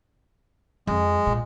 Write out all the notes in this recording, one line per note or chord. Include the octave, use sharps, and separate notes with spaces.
F2 G#3
A#2